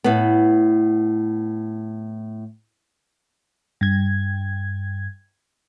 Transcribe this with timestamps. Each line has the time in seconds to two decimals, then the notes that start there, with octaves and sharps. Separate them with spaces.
0.04 A2 B3
3.81 G2 G#6